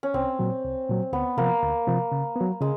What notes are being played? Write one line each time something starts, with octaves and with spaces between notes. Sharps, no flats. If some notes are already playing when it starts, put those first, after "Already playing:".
C#4
C2 C4
A#2 F#3
C2
A#2 F#3
D2 B3
C3 F3 A#3
D2
C3 F3
C#3
B3
F#3
C#3 G#3